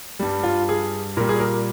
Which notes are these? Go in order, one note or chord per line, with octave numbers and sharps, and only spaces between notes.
G2 G3
F4
G#4
A#2 G3 A#4
G#4
A#4